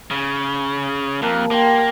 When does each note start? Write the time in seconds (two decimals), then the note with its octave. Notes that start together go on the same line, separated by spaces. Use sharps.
0.11 C#3
1.22 F2 A#3 A5
1.51 A#3 G5 C6